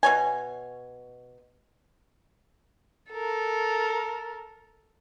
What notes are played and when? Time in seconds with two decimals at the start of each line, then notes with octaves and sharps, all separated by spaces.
0.03 B2 C#5 G#5
3.11 A4 A#4